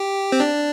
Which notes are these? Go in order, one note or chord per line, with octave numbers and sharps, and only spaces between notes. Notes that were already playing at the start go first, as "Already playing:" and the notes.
Already playing: G4
C4
D4